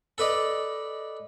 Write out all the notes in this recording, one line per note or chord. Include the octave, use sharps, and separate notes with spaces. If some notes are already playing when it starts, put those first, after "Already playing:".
A4 B4 D5 D#5